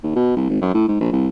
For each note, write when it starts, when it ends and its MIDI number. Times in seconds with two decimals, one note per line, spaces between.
0.03 0.13 39
0.15 0.32 47
0.37 0.49 36
0.49 0.59 32
0.62 0.73 42
0.74 0.85 45
0.88 1.00 44
1.01 1.10 34
1.12 1.28 36